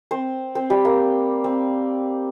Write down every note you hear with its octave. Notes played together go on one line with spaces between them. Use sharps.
C4 C5
C4 C5
G3 G4
A#3
C4